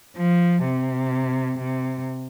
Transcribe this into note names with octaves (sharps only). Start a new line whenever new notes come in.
F3
C3
C3